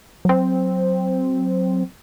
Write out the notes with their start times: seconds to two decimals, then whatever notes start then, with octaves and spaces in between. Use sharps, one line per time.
0.25 F#3 C4